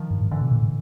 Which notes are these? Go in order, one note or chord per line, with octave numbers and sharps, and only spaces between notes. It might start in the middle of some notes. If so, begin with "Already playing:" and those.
Already playing: D#3 F3
G2
G#2
D3 E3
B2
A#2
A2